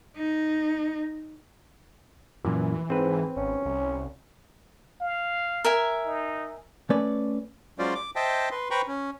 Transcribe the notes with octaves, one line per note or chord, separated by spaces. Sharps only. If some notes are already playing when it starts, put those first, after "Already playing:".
D#4
F#2 A#2 E3
G#2 C4 B4
G#1 C#4
C2
F5
A#4 E5 G#5
D#4
A3 C#4 B4 D5
F#3 G#3 C#4 F4 C5 D5
D6
C5 D#5 E5 G5 A5
B4 C6
B4 C5 G5 A#5 B5 C#6
C#4